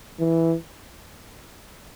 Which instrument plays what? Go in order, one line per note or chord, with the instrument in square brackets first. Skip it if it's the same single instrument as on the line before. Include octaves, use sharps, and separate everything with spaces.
[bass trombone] E3